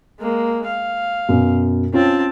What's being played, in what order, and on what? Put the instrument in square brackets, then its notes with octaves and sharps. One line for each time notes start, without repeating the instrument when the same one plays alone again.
[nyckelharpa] G#3 A#3
F5
[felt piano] F#2 B2
[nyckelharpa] C4 A5 [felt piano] C#4 F4